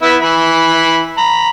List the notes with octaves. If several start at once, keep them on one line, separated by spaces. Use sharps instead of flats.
B3 E4 E5
E3 B5
A#5 B5